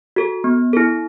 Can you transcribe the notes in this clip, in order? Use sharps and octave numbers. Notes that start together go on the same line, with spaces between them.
F#4 A4
B3
E4 A4